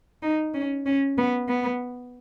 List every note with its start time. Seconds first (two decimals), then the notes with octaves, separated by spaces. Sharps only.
0.23 D#4
0.54 C#4
0.86 C#4
1.18 B3
1.48 B3